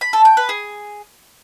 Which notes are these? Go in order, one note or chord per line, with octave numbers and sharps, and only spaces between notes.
B5
A4
G5
B4
G#4